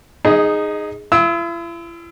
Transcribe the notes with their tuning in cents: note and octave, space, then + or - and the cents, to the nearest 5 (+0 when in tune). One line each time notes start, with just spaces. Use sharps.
D#4 -10 G#4 +0 D#5 +30
E4 +45 E6 -25